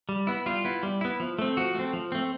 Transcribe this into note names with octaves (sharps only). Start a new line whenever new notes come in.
G3
B3 E4
G3 F4
B3 E4
G3
B3 E4
F3
A3 C4
F3 F#4
A3 C4
F3
A3 C4